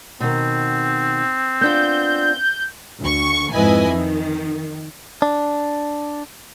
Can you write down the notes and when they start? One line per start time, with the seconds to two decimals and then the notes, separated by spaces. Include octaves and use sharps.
0.20 B2 D#3 C4
1.61 B3 D4 F4 G6
3.00 D2 C#6
3.53 F2 G#2 E4 B4 D#5 G#5
3.91 D#3
5.22 D4